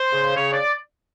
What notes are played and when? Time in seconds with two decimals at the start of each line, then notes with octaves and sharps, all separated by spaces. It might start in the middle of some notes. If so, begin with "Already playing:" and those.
Already playing: C5
0.12 C#3
0.35 C#3 C#5
0.53 D5